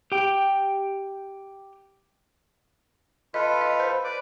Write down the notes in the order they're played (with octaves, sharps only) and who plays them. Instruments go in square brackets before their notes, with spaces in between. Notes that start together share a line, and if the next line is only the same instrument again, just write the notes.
[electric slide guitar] G4 G5
[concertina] F4 A4 B4 [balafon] D#5
[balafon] D#5
C5
[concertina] B4 D5 D6